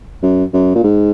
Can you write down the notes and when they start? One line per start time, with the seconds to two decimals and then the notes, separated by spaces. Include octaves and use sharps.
0.23 F#2
0.53 F#2
0.75 A#2
0.84 G#2